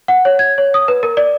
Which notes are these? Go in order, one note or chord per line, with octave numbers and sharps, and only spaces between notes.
F#5
C#5
G#6
C#5
D#6
B4
A#4
D5